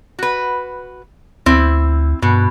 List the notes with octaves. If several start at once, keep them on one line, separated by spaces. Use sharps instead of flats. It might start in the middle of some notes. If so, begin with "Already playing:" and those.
F#4 B4
D2 C4 E4
G2 B2